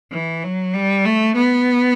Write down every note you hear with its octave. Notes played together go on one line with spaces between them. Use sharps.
E3
F#3
G3
A3
B3